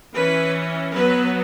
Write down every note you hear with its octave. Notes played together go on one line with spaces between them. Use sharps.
E3 C#4 B4
F#3 B3 B4